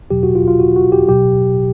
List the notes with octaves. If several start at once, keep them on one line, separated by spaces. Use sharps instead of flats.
E2 B2 F#3 G4
F#4
F4
F4
F#4
F#4
G4
B2 F#3 G4